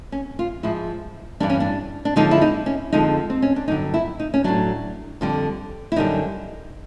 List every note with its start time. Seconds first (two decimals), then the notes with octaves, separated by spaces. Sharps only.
0.12 C#4
0.39 F4
0.63 G#2 F3 G#3 E4
1.40 G2 E3 G3 D4
1.50 C#4
1.60 D4
2.05 D4
2.16 F#2 D3 F3 G#3 D#4
2.31 E4
2.41 D#4
2.66 C#4
2.92 F2 D3 F3 G#3 D#4
3.30 C4
3.42 C#4
3.56 D4
3.68 G2 D3 F#3 D#4
3.94 E4
4.20 D#4
4.34 C#4
4.44 A2 F#3 D4
5.21 F2 D3 G3
5.92 E4
5.96 F#2 D3 G3 D#4